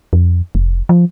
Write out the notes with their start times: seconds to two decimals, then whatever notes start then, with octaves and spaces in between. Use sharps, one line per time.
0.13 F2
0.55 F1
0.89 F3